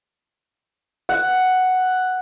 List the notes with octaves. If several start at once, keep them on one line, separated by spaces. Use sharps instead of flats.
F#5